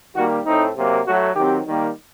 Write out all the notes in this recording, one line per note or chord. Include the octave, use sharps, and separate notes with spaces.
D#3 G3 A#3 F#4
A2 A3 C4 D#4
C3 F#3 A#3
A2 F#3 A3 F#4
D#3 F#3 C4 G4
D#3 G3 A#3